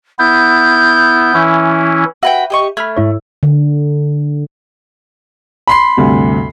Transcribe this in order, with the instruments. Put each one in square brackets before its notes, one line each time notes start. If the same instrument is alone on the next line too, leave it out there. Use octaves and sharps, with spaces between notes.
[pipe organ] B3 E4 [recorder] G6
[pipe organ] E3 C#4 E4
[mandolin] F#4 B4 G5 [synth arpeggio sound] E5
[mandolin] G4 D#5 C#6
[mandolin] A3 [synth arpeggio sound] B5 F6 G#6
[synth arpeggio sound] G#2 E4 C#5
[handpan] D3
[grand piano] B5 C6 C7
[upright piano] D2 G2 C3